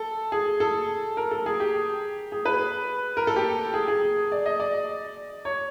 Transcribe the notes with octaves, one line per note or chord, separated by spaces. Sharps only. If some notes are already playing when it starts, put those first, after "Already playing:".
Already playing: A4
G#4
A4
A#4
A4
G#4
G4
G#4
B4
A#4
A4
G4
G#4
G#4
D5
D#5
D5
C#5